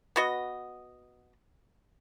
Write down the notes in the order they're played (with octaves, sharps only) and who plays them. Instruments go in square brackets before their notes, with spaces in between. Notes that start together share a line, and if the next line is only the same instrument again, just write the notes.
[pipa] B3 F#4 D#5